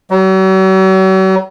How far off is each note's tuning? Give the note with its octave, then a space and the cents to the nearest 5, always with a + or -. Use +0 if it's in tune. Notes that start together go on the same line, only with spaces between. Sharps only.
F#3 +45